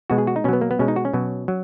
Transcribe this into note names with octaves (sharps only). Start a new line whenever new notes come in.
B2 G#3 F#4
G#4
F#4
D#4
B2 F#3 B3 C#4
A#3
B3
B2 G#3 C#4
D#4
F#4
C#4
B2 F#3
F#3